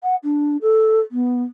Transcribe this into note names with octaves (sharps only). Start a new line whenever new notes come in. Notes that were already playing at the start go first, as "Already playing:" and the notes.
F#5
D4
A4
B3